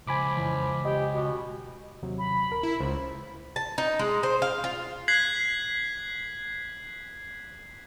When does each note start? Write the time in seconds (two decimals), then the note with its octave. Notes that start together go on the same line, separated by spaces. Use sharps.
0.07 C#2 F3 G#5 B5 D6
0.37 F2 E3
0.85 G4 D#5
1.14 B2
2.03 D#2 C3 F#3
2.18 B5
2.51 D2 A#4
2.63 E4
2.80 C#2 C5
3.56 A5
3.78 D#4
3.99 G#3
4.23 C5
4.42 F5
4.64 F4
5.08 F#6 G#6 B6 C7 F#7